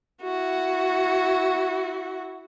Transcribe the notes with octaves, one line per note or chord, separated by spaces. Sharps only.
E4 F#4